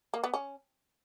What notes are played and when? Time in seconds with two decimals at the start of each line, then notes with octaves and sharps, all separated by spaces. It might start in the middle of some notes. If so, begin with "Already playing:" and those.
0.14 A#3
0.24 B3
0.34 C#4